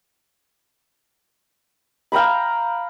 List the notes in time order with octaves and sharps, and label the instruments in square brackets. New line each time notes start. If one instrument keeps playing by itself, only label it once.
[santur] F5 G5 A#5 B5